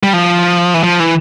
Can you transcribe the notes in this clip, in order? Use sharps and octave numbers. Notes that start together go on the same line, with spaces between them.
G3
F3
E3
F3
E3